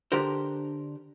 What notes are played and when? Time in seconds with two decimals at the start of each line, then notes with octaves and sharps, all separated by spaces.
0.12 D3 D4 G4 A#4 C5